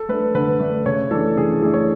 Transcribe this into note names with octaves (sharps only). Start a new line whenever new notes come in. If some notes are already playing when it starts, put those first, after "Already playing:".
Already playing: A4
A3 D4 B4
D3 B4
A3 D4
C#3 C#5
E3 A3 D4 A4
C#3 G#4
E3 A3 D4 G#4
C#5